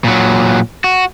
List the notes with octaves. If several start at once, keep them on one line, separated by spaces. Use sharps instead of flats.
A#2 F#3
F#4